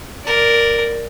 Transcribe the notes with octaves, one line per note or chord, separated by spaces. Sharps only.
A#4 D5